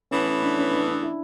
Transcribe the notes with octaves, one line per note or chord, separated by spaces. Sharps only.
A2 E3 B3 C#4
C#4
D4
C#4
D4
D4
E4